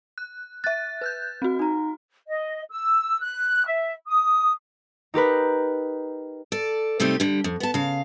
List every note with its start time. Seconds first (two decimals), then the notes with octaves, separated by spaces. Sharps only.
0.18 F#6
0.64 E5 F#6 A6
1.01 B4 F#6 G6
1.42 C4 F#4
1.59 D#4 A#5
2.28 D#5
2.70 E6
3.21 F#6
3.65 E5
4.06 D#6
5.14 D#4 G4 A#4 B4
6.52 A4 D5
7.00 C3 G3 A3 C4 D#4 G4
7.20 D3 G3
7.44 F2
7.60 B3 A5
7.74 C#3 F5